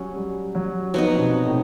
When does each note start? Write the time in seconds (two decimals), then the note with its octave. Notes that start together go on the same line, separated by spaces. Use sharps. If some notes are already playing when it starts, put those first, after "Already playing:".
Already playing: F#3 G3 C#4
0.16 G3
0.55 F#3
0.94 F3 F#3 B3 D#4
1.15 B2
1.20 C3
1.46 A2